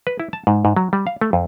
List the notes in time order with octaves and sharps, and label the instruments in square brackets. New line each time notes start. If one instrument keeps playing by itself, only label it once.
[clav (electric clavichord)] B4
E4
A5
G#2
G#2
F#3
G3
F5
A3
F2